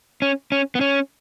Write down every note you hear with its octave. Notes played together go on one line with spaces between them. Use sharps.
C#4
C#4
B3
C#4